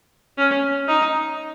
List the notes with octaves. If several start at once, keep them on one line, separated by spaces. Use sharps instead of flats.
C#4
D#4